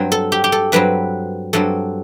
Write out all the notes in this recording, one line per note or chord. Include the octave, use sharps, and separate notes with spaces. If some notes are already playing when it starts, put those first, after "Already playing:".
Already playing: G2 F#3 C4
A4
G4
G4
A4
G2 F#3 C4 B4
G2 F#3 C4 A4